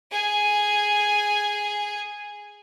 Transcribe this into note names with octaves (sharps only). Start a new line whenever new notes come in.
G#4 G#5